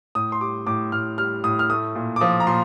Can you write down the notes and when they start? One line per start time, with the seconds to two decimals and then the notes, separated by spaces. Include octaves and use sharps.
0.15 A2 D#6
0.32 C6
0.41 G3 D6
0.67 A2 D6
0.92 A2 F6
1.18 G3 F6
1.44 A2 D#6
1.59 F6
1.70 A3 D#6
1.95 A#2
2.16 D6
2.21 F3 D#6
2.40 A#5
2.47 A#2 C6